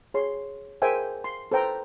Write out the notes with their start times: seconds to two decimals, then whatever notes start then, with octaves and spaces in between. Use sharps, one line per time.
0.14 G#4 C#5 C6
0.82 G#4 A#4 C5 E5 G5 G#5
1.24 C6
1.51 A4 B4 C5 G5 A#5